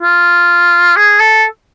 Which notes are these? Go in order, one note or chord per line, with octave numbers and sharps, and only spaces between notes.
F4
G#4
A4